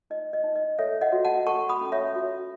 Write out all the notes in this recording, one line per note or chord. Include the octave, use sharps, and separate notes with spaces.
D#4 D#5
D#5
D#4
D#5
A4 C#5 E5
D#5 F#5
F#4
F#5 A5
A4 A5 C#6
B5 D#6
C#4
C#5 E5
F#4